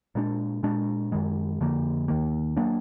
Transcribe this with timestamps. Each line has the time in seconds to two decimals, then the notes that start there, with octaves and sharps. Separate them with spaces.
0.15 A#2 G#3 B3 D4
0.63 A#2 G#3 D4
1.12 F#2 D#3 G#3
1.61 F2 D3 F3 A#3
2.08 D#2 D#3 A#3
2.56 F#3 A#3 D4